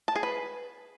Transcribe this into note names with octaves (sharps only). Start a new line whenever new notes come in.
A5
G#4
B4